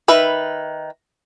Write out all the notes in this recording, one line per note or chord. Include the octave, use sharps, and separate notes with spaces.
D#3 B4 E5